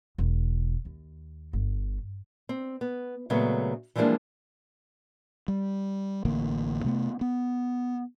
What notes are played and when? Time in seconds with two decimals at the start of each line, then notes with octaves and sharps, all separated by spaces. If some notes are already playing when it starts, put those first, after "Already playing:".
0.18 E1
0.85 D#2
1.53 G1
2.49 C4
2.81 B3
3.30 A#2 C#3 F#3 G#3 A3 B3
3.96 E3 F3 G3 G#3 A#3 D4
5.48 G3
6.25 A1 D3 A#3
6.85 C3 A3 B3
7.21 B3